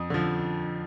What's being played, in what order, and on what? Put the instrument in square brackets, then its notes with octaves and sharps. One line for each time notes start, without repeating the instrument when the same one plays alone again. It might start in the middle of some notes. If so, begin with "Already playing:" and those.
Already playing: [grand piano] F2 D#6
D3 F3